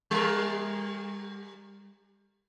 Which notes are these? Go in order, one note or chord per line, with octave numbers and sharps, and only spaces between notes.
G3 A#4